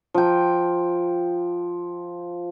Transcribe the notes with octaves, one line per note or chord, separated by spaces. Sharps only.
F3 G5